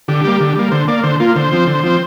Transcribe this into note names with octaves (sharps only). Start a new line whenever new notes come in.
D3 G4
G3 A#3
D3
G3 A#3
D3 C5
A#3 D5
D3 C5
A#3 F4
D3 C5
F3 C4
D3
F3 C4